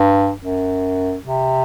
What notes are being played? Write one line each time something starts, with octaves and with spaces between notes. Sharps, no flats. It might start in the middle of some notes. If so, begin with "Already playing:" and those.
Already playing: G2
F#2
C3